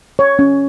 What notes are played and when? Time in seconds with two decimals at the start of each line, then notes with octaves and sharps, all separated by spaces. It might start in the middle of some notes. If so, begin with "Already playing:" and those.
0.19 C#5
0.39 C#4